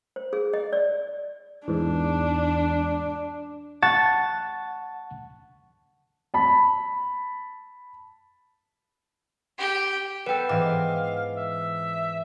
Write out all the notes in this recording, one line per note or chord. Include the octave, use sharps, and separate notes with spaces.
C5
G#4
D#5
D5
E2 G#2 D4
F#5 A5 C#6 A6
A5 B5
G4
B3 A4 B4 G5
G#2 E3 F5 D6
E5